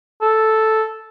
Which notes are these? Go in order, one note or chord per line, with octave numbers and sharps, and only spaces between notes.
A4